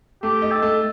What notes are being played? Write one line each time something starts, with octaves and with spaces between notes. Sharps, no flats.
A3 G4
D#4
A4
A3